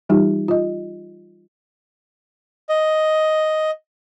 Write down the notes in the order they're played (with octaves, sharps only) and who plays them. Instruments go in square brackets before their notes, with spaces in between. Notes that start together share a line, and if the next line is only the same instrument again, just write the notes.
[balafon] E3 G3 D#4 F4 G4
F4 D#5
[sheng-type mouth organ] D#5